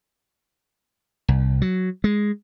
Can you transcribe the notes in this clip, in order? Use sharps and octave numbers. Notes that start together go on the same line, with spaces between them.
C2
F#3
G#3